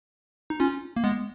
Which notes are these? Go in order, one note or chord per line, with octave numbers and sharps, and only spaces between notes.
D#4
C#4 F4
A#3
G#3 B3